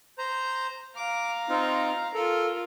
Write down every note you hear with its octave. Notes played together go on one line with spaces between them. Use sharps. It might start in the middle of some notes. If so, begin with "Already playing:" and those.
C5 A#5
F5 A#5 D6
C4 D#4 F4
F4 A4 A#4